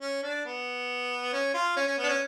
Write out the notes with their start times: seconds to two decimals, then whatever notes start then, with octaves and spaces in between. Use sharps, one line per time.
0.01 C#4
0.23 D4
0.45 B3
1.33 C#4
1.54 F4
1.76 C#4
1.87 C#4
1.98 B3
2.03 D4
2.09 C#4